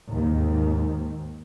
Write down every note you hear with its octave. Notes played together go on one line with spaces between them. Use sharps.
D#2 G#2 D#3